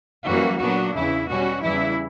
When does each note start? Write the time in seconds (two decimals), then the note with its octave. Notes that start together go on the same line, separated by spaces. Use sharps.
0.24 F#2 E3 G3 A#3 F#4
0.59 A#2 F#3 B3 D4 F#4
0.94 E2 C#3 E3 E4
1.28 B2 G3 C#4 F#4
1.62 E2 C#3 E3 G3 E4